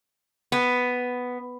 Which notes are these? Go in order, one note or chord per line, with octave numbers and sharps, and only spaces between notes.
B3